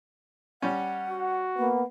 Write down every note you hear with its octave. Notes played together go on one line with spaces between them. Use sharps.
G3 C#4 F#5
F#4
A#3 B3